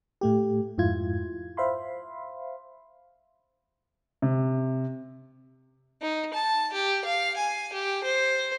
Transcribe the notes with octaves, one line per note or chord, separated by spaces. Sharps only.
A2 A3 G4
F2 G#2 E4 F4 G#6
C5 E5 F5 B5 C6
C3
D#4
A5
G4
F5
G#5
G4
C5